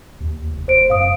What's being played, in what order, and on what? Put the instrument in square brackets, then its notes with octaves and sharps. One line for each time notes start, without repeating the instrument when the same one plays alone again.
[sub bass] D#2
F1
[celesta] C5 D7
[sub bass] F#2 [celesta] F5 D#6